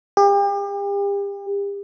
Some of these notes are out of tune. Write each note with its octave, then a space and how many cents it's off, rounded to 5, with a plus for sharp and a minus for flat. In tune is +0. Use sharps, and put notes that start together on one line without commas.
G4 +40